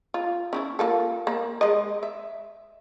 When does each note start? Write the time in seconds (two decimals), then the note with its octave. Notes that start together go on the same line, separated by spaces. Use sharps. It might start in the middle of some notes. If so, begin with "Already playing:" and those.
0.14 F4
0.53 C#4 D4 E4
0.79 A#3 F4 A4
1.27 A#3
1.61 G#3 D#5
2.03 E5